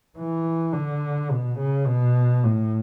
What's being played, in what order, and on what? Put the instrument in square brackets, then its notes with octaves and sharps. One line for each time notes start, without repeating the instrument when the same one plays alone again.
[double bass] E3
D3
B2
C#3
B2
A2